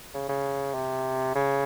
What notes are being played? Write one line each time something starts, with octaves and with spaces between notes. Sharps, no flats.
C#3
C#3
C3
C#3